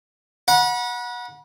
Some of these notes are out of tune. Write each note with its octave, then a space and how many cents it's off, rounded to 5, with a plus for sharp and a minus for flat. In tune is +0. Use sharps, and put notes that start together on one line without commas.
F#5 -20 B5 -40